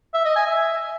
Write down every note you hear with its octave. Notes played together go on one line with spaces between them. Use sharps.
E5
D#5
G#5
E5